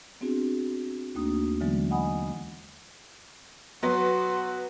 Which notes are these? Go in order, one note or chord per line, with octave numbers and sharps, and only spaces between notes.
B3 C4 D4 F#4 G#4
D#2 A3 A#3 D4 F#4 D#6
D3 E3 F#3 G#3 B3
D#5 F#5 G#5 B5 D#6
F#3 B3 F#4 B4 C6